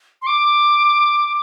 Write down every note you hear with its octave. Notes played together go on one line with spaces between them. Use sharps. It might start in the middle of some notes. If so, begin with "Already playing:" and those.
C6
D6